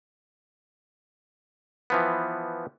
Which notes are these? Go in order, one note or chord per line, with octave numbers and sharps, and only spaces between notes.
E3 F3 B3